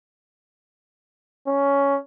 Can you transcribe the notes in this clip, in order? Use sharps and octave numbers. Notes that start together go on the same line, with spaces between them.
C#4